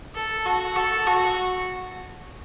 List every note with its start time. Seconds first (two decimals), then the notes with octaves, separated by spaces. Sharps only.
0.15 A4
0.45 F#4
0.76 A4
1.07 F#4